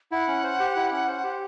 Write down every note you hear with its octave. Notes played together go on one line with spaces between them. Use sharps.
E4 F#5
C#4
C5
G4
E4
C#4
C5
G4